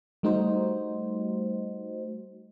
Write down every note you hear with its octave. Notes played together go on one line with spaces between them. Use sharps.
G3 A3 D#4 F#4 C5